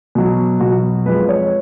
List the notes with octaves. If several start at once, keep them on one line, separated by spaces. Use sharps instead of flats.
B2 F#3
B2 F#3 F#4
F2 F3 G#3 B4
C#5